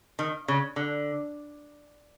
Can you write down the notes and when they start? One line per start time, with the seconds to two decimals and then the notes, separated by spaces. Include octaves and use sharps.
0.19 D#3
0.48 C#3
0.76 D3